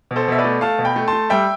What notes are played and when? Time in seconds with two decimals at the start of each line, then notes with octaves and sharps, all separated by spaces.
0.11 B2
0.16 A4 C5
0.28 B2 E5
0.39 B4 D5
0.44 A3
0.61 A3 F5 A5
0.79 B2
0.85 G5 B5
0.96 A3
1.08 A5 C6
1.13 A3
1.30 G3 E5 G5